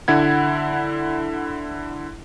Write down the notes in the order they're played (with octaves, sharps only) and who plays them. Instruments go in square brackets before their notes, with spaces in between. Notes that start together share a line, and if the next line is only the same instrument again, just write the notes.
[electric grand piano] D3 E4 F#5 G#6